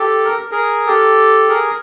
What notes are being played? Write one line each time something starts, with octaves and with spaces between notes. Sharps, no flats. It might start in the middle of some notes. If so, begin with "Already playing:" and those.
Already playing: G4 A4
A#4
G#4 A#4
G4 A4
G#4 A#4